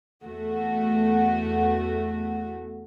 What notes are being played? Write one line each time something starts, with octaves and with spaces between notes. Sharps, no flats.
E2 A3 F#4